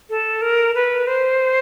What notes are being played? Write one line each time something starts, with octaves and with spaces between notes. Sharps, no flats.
A4
A#4
B4
C5